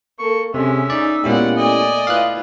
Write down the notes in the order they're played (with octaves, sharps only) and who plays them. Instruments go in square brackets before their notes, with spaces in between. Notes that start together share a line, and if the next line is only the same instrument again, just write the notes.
[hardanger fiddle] A#3 A4 [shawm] C#6
[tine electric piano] C3 [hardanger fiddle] G#3 C#4 [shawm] E5
[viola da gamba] D#4 [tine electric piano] D5
[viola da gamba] A#2 G#3 B3 [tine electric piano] C#4 E4 G4 [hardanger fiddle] D5 F#5
[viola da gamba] A3 [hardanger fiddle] D5 G#5 [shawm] D#5
[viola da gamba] E4 F4 B4 [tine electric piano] F5 F#6